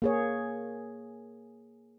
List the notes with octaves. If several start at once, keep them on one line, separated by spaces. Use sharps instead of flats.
A#3 G#4 C#5